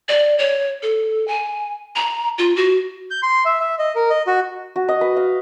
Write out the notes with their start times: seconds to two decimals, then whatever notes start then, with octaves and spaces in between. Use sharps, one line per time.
0.09 D5
0.39 C#5
0.83 A4
1.28 G#5
1.96 A#5
2.38 F4
2.56 F#4
3.11 G6
3.23 C6
3.45 E5
3.60 E5
3.79 D#5
3.95 A#4
4.10 D#5
4.27 F#4
4.76 F#4
4.88 D#5
5.01 B4
5.16 F5